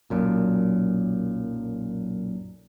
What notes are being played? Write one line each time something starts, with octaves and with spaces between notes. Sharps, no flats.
B1 F#2 A#2